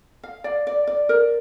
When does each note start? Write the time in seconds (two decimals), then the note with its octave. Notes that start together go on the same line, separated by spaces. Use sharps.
0.24 F5
0.44 D5
0.67 D5
0.87 D5
1.09 A#4